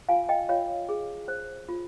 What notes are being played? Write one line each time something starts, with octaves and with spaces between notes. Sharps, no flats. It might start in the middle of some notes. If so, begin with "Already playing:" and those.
F4 F5 G#5
D#5 G5
F4 C#5 F5
G#4
C5
F4